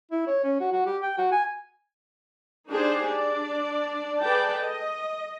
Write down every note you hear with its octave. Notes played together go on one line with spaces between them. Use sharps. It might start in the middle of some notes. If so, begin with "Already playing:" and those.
E4
C#5
C#4
F#4
F#4
G4
G5
F#4
G#5
D4 D#4 G4 G#4 C5
D4 D5
G#4 A4 B4 D5 G5 A5
D#5